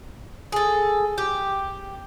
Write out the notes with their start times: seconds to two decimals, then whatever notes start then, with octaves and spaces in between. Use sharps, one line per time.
0.52 G#4 A4
1.18 G4